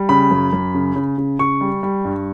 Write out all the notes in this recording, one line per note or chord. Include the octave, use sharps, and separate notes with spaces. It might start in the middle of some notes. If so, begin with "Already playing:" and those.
Already playing: G3
C#3 B5
F#2
F#2
C#3
C#3
C#3
C#3 C#6
G3
G3
G2